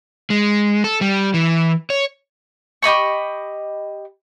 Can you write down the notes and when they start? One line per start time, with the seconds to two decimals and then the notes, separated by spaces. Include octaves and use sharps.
0.30 G#3
0.84 A4
1.01 G3
1.34 E3
1.90 C#5
2.82 G4 D#5 B5 C#6